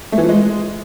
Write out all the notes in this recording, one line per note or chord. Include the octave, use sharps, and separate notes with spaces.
A3
E3
F3
G#3